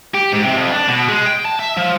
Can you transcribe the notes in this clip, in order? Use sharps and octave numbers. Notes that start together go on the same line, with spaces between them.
G4
G#2
C3
F2
D4
B2
G#3
G5
A5
E5
F3